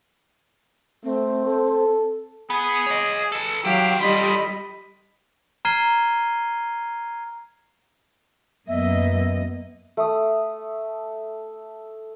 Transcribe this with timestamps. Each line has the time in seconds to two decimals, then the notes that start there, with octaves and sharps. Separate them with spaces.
1.04 A3 C4
1.46 A4
2.50 B3 G#4
2.86 C#5 D#5
3.32 A4 B4
3.65 F#3 G4 B4 F5 G5
4.01 G3 F4 A4 D#5 B5
5.65 A#5 F6 G#6 C7 D#7 G7
8.68 F#2 A#3 B3 D#5 E5
9.97 A3 D#6